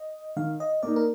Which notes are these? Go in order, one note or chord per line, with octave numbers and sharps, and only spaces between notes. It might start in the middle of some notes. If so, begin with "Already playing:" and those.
Already playing: D#5
D#3 F5
D#5
A#3 D#4 D5
A#4